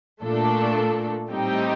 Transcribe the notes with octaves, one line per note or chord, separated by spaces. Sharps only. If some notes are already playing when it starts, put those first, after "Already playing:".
A#2 A3 D4 A4
A2 G3 C4 D#4 G4